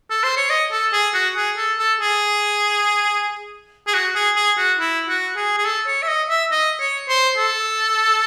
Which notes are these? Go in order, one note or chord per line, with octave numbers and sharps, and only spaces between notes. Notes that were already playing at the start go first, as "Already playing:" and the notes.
A4
C5
C#5
D#5
A4
G#4
F#4
G#4
A4
A4
G#4
G#4
F#4
G#4
G#4
F#4
E4
F#4
G#4
G#4
A4
C#5
E5
D#5
E5
D#5
C#5
C5
A4